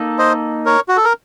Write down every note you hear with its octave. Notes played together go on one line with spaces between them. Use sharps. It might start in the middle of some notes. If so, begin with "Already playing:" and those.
Already playing: A#3 D#4 A4
C5 D#5
A#4 C#5
F#4
A4
A#4